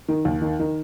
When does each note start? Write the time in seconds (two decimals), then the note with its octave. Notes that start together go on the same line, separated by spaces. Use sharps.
0.08 D#3
0.25 D#2
0.42 D#3
0.60 D#3